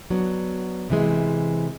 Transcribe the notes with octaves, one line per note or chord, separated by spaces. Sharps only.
F#3 B3 D4 F#4
C3 E3 G#3